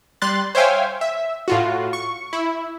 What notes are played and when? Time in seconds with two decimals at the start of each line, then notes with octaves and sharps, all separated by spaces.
0.22 G3 C6 F#6 A6
0.55 C5 C#5 E5 F5 G5 G#5
1.01 E5
1.48 A2 F4 F#4
1.93 C#6
2.33 E4